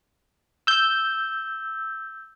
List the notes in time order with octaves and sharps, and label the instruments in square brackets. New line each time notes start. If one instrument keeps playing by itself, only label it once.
[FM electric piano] E6 G6